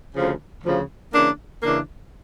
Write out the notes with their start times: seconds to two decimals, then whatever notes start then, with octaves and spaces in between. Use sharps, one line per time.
0.15 D2 C#3 F3
0.64 D2 C#3 F3
1.13 C#3 E3 A#3 D4
1.62 C#3 E3 A#3 D4